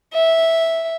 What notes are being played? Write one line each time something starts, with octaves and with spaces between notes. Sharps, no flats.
E5